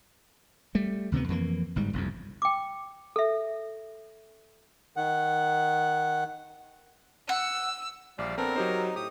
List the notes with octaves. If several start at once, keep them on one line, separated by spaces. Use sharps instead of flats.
G3 A3
D2 C3 D#3 B3
F2 E3 A#3
G1 G#2 G3
F1 C2 F2
G5 D6
A4 E5
D#3 F#5
F#5 E6
A#1 G3 D5 F5
B3 C4 D4 A4 A#4
F#3 D#4 G4 C5
A2 G4 D#6